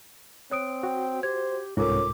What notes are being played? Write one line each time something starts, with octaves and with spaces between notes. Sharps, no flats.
C4 C#5 D#6 D7
F#4 G5
G4 C5 G#6
C2 G#2 C#4 F4 A4 A#4 D6